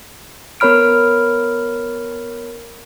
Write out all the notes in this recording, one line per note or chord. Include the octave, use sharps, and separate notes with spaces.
B3 A#4 C#5 B5 F6 D7